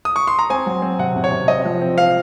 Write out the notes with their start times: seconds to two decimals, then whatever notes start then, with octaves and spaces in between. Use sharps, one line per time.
0.05 D#6
0.16 C#6
0.27 C6
0.39 A#5
0.50 C4 G#5
0.66 F#3
0.82 C4
0.99 C3 F#5
1.16 C3
1.24 C#5
1.32 C3
1.48 C4 D#5
1.65 F3
1.82 C4
1.98 C4 F5